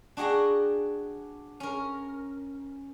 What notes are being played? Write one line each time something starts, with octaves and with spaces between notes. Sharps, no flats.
D4 F#4 G#4 F#5 G5 A#5
C#4 A#4